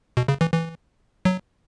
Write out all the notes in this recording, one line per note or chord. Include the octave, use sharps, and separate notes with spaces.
B2
C#3
E3
E3
F#3